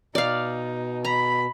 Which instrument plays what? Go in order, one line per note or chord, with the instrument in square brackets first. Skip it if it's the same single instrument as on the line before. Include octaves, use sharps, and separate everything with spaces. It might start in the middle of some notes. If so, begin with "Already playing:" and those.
[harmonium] B2 [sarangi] D#4 [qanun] D5 F5
[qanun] A#5 [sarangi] B5